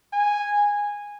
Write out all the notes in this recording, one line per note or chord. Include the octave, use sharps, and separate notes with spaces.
G#5